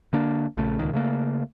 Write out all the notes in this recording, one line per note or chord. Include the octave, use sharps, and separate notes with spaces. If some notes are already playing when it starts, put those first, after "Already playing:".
D3 A#3 D4
A#1 C#3 A3
D#1 C#2 D#3
C#3 A3 A#3